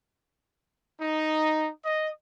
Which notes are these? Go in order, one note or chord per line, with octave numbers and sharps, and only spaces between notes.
D#4
D#5